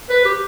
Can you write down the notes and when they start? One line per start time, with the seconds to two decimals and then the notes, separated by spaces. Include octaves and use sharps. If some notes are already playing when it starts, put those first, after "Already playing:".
0.10 B4
0.25 G4